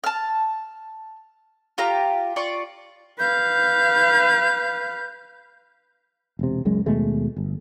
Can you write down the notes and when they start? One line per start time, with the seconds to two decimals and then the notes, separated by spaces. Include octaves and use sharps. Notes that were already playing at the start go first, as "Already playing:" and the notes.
0.04 A5 F6
1.78 F4 G4 A#5
2.36 F4 D5 C#6
3.19 B4 F5 G6
6.39 E1 C3
6.65 F#1 C#2 F#2 G#3
6.86 D#2 B2 G#3 A3
7.37 G1